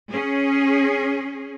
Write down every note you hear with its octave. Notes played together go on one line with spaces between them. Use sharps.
C#4 G#4